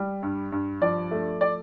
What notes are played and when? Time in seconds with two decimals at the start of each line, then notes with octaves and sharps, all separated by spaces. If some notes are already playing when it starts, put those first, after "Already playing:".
Already playing: G3
0.23 G2
0.52 G2
0.81 F3 D5
1.11 A3
1.41 D5